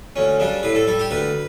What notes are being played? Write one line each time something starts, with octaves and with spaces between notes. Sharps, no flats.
D2 C#4
C#3 G3 D4
A2 B4
A4
G3 A4
G4
D2 B4